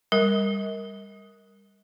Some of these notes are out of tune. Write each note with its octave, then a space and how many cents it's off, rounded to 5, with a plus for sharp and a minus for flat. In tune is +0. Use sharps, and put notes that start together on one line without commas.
G3 +25 A#4 +0